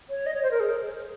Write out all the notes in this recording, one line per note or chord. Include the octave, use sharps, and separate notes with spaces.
C#5
D#5
C#5
C5
A#4
G#4